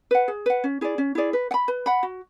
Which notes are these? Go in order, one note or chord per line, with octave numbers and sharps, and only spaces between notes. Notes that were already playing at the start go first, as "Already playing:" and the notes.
B4 F#5
G#4
B4 F#5
C#4
E4 G#4 D5
C#4
E4 G#4 D5
B4
F#5
B5
B4
F#5 B5
F#4